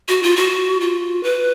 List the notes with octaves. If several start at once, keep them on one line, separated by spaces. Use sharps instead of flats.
F#4
F4
F#4
F4
B4